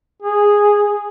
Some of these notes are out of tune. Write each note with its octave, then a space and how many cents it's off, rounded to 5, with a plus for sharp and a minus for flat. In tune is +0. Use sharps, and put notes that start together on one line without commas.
G#4 -5